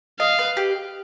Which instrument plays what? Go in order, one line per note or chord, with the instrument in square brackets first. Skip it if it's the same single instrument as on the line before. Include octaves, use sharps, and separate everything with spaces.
[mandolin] D#5 [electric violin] F5
[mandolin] B4
G4